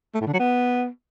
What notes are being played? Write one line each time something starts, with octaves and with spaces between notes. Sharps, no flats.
A3
A2
D3
F#3
B3